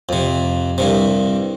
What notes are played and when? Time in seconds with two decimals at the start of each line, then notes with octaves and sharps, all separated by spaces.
0.09 F2 C3
0.78 C2 G2 C3